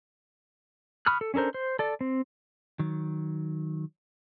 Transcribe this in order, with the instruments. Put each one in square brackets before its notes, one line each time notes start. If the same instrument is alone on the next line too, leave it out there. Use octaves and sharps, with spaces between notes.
[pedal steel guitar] B5 C#6 D#6 F6 F#6
A4
C#4 D4 A4 A#4 C5
C5
A4 D5
C4
[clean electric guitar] D#3 F#3